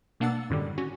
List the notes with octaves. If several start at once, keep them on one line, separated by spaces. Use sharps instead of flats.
B2 A#3 D4 F#5 E6 A6
F#2 A2 D3 D#3 G3
C#4 F#4